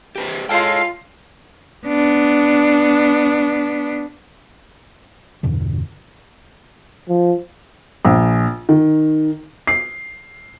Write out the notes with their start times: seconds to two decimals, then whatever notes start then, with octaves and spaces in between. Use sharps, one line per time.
0.16 G4 B4 C5
0.49 G#3 F4 A4 C#5 F5 G5 C7
1.87 B3 D4
5.43 E2 G2 B2 D3
7.09 F3
8.05 A#1
8.69 D#3
9.67 C7